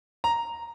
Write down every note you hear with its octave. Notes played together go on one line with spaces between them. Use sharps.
A#5